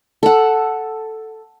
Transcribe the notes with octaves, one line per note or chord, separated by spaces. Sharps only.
A4 F#5